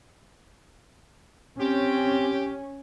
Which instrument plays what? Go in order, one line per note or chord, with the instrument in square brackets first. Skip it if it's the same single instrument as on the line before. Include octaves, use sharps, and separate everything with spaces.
[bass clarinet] C4 [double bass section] C#4 [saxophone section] G4